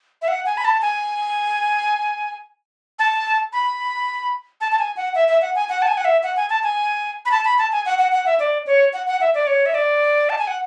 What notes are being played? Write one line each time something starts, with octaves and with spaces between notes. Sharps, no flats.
E5
F#5
G#5
B5
A5
G#5
A5
B5
A5
A5
G#5
F#5
E5
E5
F#5
G#5
F#5
A5
G#5
F#5
E5
F#5
G#5
A5
G#5
B5
A5
B5
A5
G#5
F#5
F#5
F#5
E5
D5
C#5
F#5
F#5
E5
D5
C#5
E5
D5
A5
G#5
F#5